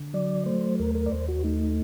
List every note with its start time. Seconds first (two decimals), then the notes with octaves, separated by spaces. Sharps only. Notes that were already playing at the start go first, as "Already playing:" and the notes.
Already playing: D3
0.14 F#3 D5
0.46 A3 C5
0.79 D#2 A#4
0.95 A#4
1.06 D5
1.12 D#2 C5
1.28 F#4
1.44 A3 D#4